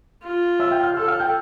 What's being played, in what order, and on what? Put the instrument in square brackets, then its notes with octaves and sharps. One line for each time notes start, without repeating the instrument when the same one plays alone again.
[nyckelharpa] F4
[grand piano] E5 E6
G5 G6
F5 F6
[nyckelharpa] A4 [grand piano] E6
[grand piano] F5 F6
G5 G6